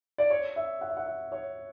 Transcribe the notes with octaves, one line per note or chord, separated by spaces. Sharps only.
D5
C#5
E5
F#5
E5
F#5
E5
C#5